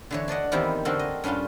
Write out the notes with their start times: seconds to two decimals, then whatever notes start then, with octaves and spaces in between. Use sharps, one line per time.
0.11 D3 E3 C#5
0.28 D4 D5 D#5 F#5
0.52 E2 D#3 C4 D#4 E4 G4
0.85 D3 C4 F#4 A4 A#4
0.99 D#5
1.24 G2 C#4 D4 F4 G4